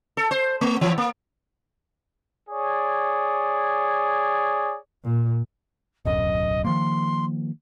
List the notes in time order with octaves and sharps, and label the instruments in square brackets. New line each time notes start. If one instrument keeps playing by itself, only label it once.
[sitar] A4
C5
A3
E3
A#3
[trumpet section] G#4 C#5 D5
[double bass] A#2
[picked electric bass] D1 B1 F#2 [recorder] D#5
[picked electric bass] D#3 F3 A#3 [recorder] C6